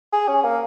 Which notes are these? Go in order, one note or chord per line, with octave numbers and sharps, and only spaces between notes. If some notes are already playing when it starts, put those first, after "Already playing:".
G#4
C#4
A#3